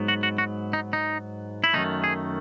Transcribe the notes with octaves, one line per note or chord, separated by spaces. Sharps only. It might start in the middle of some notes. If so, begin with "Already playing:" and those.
Already playing: G#2 F#3 B3
F#4
F#4
F#4
D#4
D#4
E4
F#2 D#3 A3 D#4
G#4